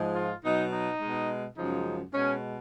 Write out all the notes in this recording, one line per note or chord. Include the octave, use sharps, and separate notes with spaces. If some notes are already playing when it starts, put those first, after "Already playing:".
Already playing: G#2 F3 G#3
F4
B2 F#3 D#4
D#4
B2 G#3
F#2 C#3 F3 G#3 D#4
B2 G#3 C#4